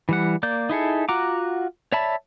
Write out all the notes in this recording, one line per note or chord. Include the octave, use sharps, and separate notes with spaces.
E3 G3 F#5
A#3 D5 G6
D#4 E4 G#4 A4
F4 F#4 F#5 A#5 D6
C#5 D5 E5 A5 B5